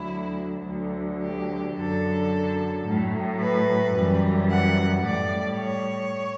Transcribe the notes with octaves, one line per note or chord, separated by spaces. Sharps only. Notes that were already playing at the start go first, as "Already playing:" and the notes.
Already playing: D2 D3 F#3 E4
D2 D3 F#3
G4
F#2 D3 F#3 A4
A2 F#3
B4
F#2 E3 G3
F#5
A2 G3 D5
C#5